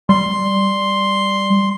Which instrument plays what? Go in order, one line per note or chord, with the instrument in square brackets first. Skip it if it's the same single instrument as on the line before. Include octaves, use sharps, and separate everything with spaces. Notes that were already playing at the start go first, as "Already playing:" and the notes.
[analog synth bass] G3 [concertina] C6